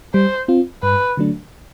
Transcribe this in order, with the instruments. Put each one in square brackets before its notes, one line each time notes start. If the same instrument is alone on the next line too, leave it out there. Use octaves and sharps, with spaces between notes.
[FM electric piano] G3 [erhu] C5
[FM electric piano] C4 F4
[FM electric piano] G2 [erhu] B4
[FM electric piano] D3 F#3 A3 D4